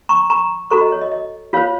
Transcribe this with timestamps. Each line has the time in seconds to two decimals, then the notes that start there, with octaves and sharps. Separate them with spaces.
0.09 A#5 C#6
0.30 A#5 C#6
0.71 F#4 A4 C5 A#5 C#6
0.81 D#5
0.92 C#5
1.01 D#5
1.12 D#5
1.53 F4 C5 C#5 F5